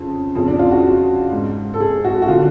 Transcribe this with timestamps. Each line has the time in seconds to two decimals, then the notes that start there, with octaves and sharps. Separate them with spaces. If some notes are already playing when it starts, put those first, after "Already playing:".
Already playing: F2 C#3
0.35 F2 C#3
0.48 D4
0.59 F4
0.71 F#4
1.32 G#2
1.74 A4
1.80 G#4
2.04 F#4
2.22 F#4
2.28 D3 F4